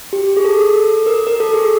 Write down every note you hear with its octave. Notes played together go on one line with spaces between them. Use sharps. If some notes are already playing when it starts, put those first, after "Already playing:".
G4
G#4
A4
A4
A#4
A#4
A4
G#4